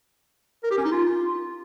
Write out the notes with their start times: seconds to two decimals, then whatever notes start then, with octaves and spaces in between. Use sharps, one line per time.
0.63 A#4
0.70 G4
0.77 C#4
0.85 D#4
0.92 F4